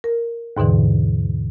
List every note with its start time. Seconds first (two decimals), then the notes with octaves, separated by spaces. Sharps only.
0.04 A#4
0.57 D#2 G#2 B2 D3 E3